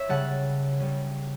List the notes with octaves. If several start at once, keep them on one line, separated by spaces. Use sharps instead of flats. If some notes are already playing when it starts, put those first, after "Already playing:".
Already playing: C#5 E5
C#3 G3 C#4 F#5 A5
C#3 G3 C#4